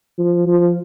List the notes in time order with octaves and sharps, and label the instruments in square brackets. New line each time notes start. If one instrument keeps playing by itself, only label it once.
[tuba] F3
F3